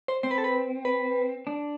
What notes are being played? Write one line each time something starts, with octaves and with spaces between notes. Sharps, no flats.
C5
C4 C5
B4
A4
B4
B4
D4